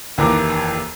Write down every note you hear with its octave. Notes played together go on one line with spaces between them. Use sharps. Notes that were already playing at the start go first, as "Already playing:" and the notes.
F1 D#2 E3 A#3 A#5 D6